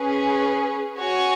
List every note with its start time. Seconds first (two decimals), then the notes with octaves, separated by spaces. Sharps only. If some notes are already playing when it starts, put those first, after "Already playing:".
Already playing: C#4 G#4 B4
0.97 F#4 C#5 G#5